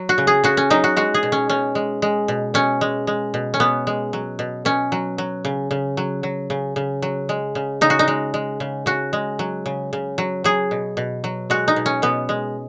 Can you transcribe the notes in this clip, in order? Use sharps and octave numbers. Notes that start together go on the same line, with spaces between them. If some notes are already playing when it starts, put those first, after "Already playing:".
Already playing: F#3
F#4
C#3
G#4
C#3 F#4
C#4
F#3 D#4
F#4
G#3 F#4
G#4
B2
C#4
B2 C#4
G#3
G#3
B2
B2 C#4
G#3
G#3
B2
C#4
B2 B3
G#3
F#3
B2
B2 C#4
F#3
F#3
C#3
C#3
F#3
F#3
C#3
C#3
F#3
G#3
C#3
C#3 D#4
F#4
D#4
G#3
G#3
C#3
C#3 F#4
G#3
F#3
C#3
C#3
F#3
F#3 G#4
B2
B2
F#3
G#3 F#4
D#4
B2
C#4
B2 B3
G#3